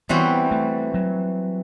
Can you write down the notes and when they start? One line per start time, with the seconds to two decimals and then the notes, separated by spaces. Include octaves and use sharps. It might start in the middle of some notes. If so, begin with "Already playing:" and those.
0.09 E3 G3 B3 C4 F#4
0.51 A3
0.94 F#3